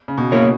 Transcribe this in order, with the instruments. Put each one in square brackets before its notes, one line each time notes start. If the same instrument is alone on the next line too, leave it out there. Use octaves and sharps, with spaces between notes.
[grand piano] C#3
B2
[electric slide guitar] A#3 E4 A#4 C#5